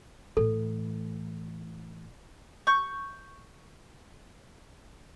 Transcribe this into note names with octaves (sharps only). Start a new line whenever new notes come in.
A2 E3 A4
C#6 G6